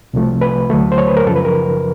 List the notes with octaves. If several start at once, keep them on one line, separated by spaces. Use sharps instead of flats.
C2 C3 F3 A3
B4
D2 D3 F#3 A3
C5
C#5
B4
A#4
F#2 C#3 F3 A4
B4
A#4